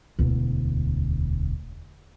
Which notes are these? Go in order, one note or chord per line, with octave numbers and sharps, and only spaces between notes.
E1 D2